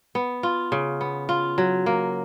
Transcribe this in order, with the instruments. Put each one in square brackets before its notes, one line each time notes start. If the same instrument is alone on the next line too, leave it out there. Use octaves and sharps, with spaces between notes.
[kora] B3
F4
C#3
B3
F4
F#3
A#3